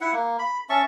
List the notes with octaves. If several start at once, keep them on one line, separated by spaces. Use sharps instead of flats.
E4 F#5
A#3
B5
C#4 E5 A5 C#6